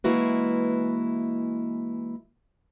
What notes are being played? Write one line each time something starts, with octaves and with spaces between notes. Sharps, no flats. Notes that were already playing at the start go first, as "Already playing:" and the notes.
E3 G#3 A#3 E4 F#4 B4